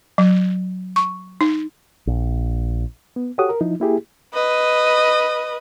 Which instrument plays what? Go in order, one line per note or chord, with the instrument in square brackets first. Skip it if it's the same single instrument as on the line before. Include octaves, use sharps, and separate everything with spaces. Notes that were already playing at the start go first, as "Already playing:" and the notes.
[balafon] F#3
C#6
D#4
[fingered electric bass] A#1
[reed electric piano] B3
F#4 G4 A4 C#5 F#5 D#6
A#4
F3 D#4 E4
A#3 E4 G4 G#4
[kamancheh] B4 D#5